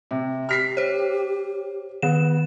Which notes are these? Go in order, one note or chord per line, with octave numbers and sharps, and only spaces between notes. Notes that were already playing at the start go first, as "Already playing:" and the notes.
C3
G4 F6 B6 C7
C5 C#5
D#3 B3 E7